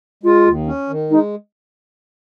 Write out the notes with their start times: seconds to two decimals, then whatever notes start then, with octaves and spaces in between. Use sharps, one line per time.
0.23 G#3 F4
0.46 D#2
0.67 C#4
0.89 D#3
1.10 G#3 D#4